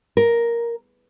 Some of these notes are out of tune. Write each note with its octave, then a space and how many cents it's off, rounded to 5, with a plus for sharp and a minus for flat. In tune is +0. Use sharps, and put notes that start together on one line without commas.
A#4 +5